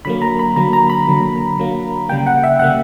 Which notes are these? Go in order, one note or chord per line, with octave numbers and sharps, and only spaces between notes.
D3 F#3 A#3 B5
A#5
B5
D3 F#3 A#3 A#5
A#5
B5
D3 F#3 A#3
D3 F#3 A#3
C#3 G3 A#3 G5
F#5
E5
C#3 G3 A#3 F#5